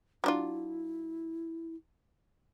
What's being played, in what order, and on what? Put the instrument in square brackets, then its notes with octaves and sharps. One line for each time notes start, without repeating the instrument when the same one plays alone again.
[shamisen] F#3 D4 F4 [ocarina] E4